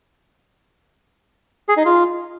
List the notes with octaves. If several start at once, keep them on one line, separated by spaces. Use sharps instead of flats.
G#4
D#4
F4